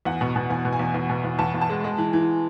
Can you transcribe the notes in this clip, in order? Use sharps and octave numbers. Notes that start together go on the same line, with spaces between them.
E2 F#5
B2
B2
E2 G#5
B2
G#5
E2
E2
B2
E2
E2 A5
E2
A5
G#3
G#3
E3
E3